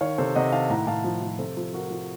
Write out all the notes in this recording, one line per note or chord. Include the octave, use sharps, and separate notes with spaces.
D#3 C#5 F5
C3 A4 C5
C3 D#5 F#5
D#3 F5 A5
A2 F#5 A#5
A2 F5 A5
F3
F3
C3 A4 C5
F3
F3 F#4 A#4
F3